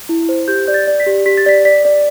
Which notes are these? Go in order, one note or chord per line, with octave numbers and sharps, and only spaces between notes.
E4
C5
G4 G6
D5 G6
A6
D5
B6
G4
G4 B6
A6
D5 B6
D5 B6
D5